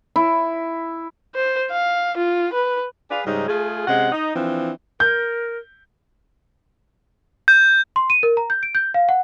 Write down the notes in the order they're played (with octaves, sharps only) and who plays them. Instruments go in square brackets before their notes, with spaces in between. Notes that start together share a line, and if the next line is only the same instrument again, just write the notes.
[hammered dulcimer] E4
[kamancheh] C5
F5
F4
B4
[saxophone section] G#4 B4 D5 F5
G#2 C#3 G3 D#4
A3 F4 G#4
C3 G#3 C#4 F#5
D#4
E3 F3 C4 D4
[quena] A#4 [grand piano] G6
[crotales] G6
[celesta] C6
D#7
A#4
A#5
G6
D7
G6
F5
F#5